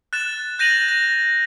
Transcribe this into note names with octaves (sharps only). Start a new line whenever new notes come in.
F#6 A6 E7
G6 A#6 D#7 F7 F#7
A#6